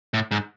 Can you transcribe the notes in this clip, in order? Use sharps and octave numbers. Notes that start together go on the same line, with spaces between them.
A2
G#2